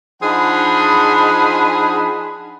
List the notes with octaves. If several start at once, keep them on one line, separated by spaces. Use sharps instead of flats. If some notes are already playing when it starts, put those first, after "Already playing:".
F3 D4 D#4 G#4 F#5 B5